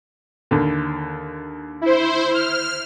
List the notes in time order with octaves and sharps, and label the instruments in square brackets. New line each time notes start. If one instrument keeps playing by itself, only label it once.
[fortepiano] D#2 D3
[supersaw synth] E4 C5
F6